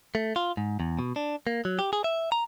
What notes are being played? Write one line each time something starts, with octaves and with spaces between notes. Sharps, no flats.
A3
F4
G#2
E2
B2
D4
A#3
F#3
G4
G#4
E5
A#5